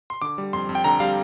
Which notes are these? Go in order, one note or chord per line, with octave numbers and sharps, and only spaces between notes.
C6
D3 D6
G3
F2 C6
F2
G5
D3 A#5
G3 F5